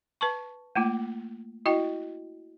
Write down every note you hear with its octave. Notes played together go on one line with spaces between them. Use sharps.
B4 A5 C#6
A3 A#3 F4
E4 F#4 D#5 G5